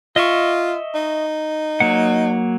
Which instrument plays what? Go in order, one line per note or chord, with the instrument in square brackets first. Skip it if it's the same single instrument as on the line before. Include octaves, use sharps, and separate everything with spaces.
[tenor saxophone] F4 [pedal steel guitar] D#5 E5 C#6
[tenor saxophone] D#4
[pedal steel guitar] F#3 A#3 F#5